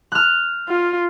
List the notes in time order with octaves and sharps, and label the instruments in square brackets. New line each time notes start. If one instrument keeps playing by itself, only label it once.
[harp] F6 F#6
[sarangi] F4